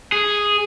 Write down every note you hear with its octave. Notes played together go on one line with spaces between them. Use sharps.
G#4